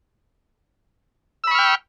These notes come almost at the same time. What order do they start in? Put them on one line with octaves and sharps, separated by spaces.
E6 B5 C#6 F6 G5